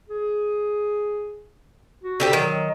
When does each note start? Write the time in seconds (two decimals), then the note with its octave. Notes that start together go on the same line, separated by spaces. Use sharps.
0.09 G#4
2.03 F#4
2.20 D3 G4 C5
2.33 D#3 F#3